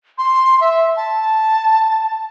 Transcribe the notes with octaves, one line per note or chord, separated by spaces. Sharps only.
C6
E5
A5